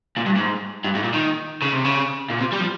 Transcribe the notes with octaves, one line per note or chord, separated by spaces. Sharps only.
A#2
G2
G#2
G2
G#2
A#2
D#3
C#3
C3
C#3
A#2
C3
G3
F3